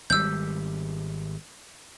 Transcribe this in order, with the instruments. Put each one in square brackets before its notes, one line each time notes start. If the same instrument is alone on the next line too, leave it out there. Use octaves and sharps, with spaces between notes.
[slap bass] G#1 G3 [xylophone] E6 G6